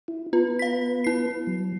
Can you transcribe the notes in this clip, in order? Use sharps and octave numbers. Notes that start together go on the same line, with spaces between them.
E4
B3 F4 B4
F5 B6
E4 C7
F#3